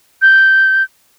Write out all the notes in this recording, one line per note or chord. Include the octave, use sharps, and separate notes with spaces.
G6